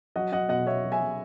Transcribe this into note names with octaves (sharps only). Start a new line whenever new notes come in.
F#3 D#5 F#5
F#3 D#5 F#5
B2 D#5 F#5
B2 C#5 E5
F#3
E5 G#5
F#3